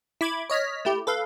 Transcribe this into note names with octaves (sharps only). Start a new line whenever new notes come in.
E4 B5 D6 G#6
C#5 D#5 F6 B6
A3 E4 G4
A4 B4 F5